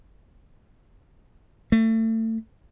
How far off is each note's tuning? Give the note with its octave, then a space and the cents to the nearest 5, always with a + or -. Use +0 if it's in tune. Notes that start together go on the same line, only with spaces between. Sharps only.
A3 +30